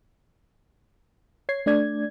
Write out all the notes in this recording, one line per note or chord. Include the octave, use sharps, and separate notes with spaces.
C#5 G#6 C7
A3 D4 D5 G#6